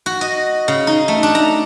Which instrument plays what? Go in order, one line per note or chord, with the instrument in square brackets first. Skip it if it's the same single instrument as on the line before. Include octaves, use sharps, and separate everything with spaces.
[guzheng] F#4
D#5
C#3
D#4
A3
D4
A#5